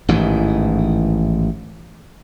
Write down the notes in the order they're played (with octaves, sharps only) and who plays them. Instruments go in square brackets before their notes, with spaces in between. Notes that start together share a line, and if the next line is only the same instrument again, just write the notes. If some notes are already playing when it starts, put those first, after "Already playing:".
[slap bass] A1 G#2 D#3 E3